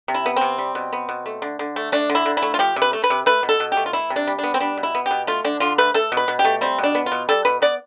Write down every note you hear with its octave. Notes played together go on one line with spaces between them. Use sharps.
C3
E4
B3
C3 C4
G3
B2
B3
B2
A3
D3
D3
A3
A3 D4
D3
E4
D3
E4
A3
F4
F3 G4
C3
B4
A3
B4
C3
A3 B4
B2
A4
B2
G4
A3
F4
E3 E4
C3
D4
G3
B3 D4
C4
G3 D4
B2
E4
B3
B2 G4
A3 F4
D3 D4
D3 F4
A3 B4
A3 A4
B2
B4
B2
G4
A3
G3 C4
B2
D4
B3
F4
B2
G3 A4
B2 B4
B3 D5